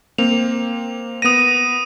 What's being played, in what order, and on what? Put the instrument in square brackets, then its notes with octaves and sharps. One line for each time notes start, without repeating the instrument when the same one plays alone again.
[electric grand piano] A#3 C4 [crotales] F7
[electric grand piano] B3 A#6 [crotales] D#6 D#7